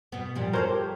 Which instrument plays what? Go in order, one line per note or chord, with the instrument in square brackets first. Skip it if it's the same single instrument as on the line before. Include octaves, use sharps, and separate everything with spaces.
[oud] B2 B3
A#2 F3 G3
[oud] F4 F#4 A4 [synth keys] A#4 C5 C#5
[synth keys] G4